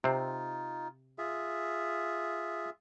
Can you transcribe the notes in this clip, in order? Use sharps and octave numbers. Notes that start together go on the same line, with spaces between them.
C3 C4 D#4 F4
F4 G#4 E5